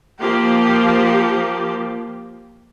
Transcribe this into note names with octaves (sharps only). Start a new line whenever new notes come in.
F3 A#3 G4